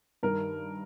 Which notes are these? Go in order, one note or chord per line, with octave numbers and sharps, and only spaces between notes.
G2 D#3 A#4